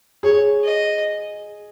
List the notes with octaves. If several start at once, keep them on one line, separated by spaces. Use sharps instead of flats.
G#4 C#5
D#5